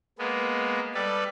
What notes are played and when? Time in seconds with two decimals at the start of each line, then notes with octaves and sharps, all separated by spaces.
0.19 G#3 A#3 B3
0.94 G3 A4 B4 D5